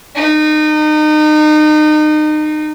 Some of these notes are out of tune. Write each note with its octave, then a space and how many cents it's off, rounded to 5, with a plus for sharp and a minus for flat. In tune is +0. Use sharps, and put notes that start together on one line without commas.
D#4 -30